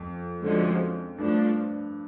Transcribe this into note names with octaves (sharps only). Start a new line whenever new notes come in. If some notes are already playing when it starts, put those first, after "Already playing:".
Already playing: F2
D3 F3 G#3 C#4 F#4
G2 F3 A3 D4